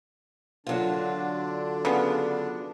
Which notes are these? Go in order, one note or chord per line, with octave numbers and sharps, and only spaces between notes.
D3 F#3 D4 F4
C#3 B3